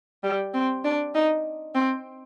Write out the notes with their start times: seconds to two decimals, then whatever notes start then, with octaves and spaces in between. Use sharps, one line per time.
0.23 G3
0.54 C4
0.84 D4
1.15 D#4
1.75 C4